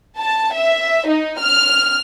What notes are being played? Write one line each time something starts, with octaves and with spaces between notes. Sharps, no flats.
A5
E5
D#4
F6